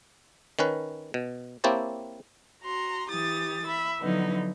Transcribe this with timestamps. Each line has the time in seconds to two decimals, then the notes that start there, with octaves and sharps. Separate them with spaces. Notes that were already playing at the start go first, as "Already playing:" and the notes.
0.59 D#3 C#4 B4
1.14 B2
1.64 A#3 C4 E4 G4 C#5 A5
2.62 F#4 A#5 C6
3.08 E3 G4 D#6 A6
3.65 E5 B5
3.99 D3 F3 F#3 B3 D#4 E4